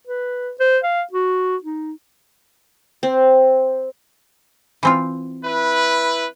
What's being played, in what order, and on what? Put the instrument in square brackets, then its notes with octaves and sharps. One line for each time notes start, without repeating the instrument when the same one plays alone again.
[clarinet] B4
C5
F5
F#4
D#4
[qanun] C4
[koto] E3 C4 F4
[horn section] E4 B4